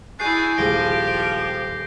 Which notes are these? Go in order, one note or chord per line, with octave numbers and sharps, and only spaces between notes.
D4 E4 F#4 G#4 G#5 G6 C7
D#1 F3 G#3 G4 A#6 D7 G7